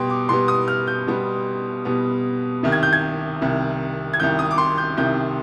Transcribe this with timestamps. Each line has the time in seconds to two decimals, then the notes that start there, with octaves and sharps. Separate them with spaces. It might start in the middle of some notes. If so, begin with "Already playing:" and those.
Already playing: B2 G3 B3 G5 C6
0.10 D6
0.29 B2 G3 B3 C6
0.48 D#6
0.68 F6
0.87 G6
1.07 B2 G3 B3
1.85 B2 G3 B3
2.63 C2 C3 D#3
2.72 G#6
2.83 G6
2.93 G#6
3.42 C2 C3 D#3
4.13 G#6
4.20 C2 C3 D#3 G6
4.39 D#6
4.51 D6
4.58 C6
4.78 G6
4.97 C2 C3 D#3 G6